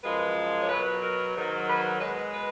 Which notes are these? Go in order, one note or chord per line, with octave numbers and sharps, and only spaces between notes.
F#2 F3 G#3 B4
C#5
B2 F#3 B4
A#4
G#2 D#3 F#3
B4
B2 G#3 B4
B4